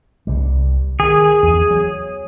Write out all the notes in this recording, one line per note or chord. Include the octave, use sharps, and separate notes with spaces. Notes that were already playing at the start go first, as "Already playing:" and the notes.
C2 G3
D#3 G#4
E2
F#3